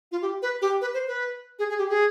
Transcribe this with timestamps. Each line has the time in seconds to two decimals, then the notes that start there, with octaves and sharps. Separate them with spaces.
0.12 F4
0.22 G4
0.42 B4
0.62 G4
0.81 B4
0.94 C5
1.08 B4
1.59 G#4
1.69 G#4
1.79 G4
1.90 G#4